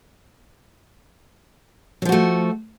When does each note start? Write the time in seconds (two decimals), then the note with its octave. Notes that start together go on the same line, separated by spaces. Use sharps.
2.02 F#3
2.05 F3
2.09 F#4
2.12 A3